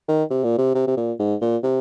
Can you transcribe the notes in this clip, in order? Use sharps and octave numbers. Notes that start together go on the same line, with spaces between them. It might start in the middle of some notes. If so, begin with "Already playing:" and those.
D#3
C3
A#2
C3
C3
C3
A#2
G#2
A#2
C3